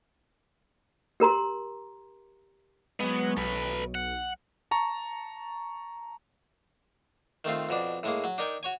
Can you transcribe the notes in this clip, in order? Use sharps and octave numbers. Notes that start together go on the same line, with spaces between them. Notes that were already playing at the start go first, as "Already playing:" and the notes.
G4 A#4 A#5 C6
F#3 G#3 B3
B1 A4 B4
F#5
A5 A#5 C#6
D#3 A3 C4 F4
F2 B2 D4
A2 G#3 A#3
F#3
D4 D#4 A#4 G5 G#5
F#4 C#5 G#5